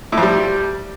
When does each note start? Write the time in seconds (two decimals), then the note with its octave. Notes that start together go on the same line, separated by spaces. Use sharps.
0.12 A2
0.17 F2
0.23 G3